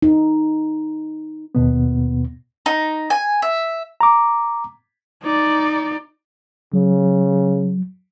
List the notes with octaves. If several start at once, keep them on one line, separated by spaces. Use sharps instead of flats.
D#4
D#2 B2 B3
D#4
G#5
E5
A#5 D6
D#4 D5
C#3 F#3